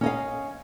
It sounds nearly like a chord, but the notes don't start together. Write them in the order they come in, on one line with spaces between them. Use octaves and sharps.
C#4 D#5 F5